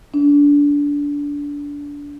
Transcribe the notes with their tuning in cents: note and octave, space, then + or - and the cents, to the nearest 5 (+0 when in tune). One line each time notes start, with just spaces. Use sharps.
D4 -25